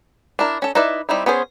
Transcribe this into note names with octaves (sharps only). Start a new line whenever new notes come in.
D4 E4 A#4
C#4 A4
D#4 E4 B4 D5 E5
G3 C4 D#4 E4
B3 C#4 G#4 C5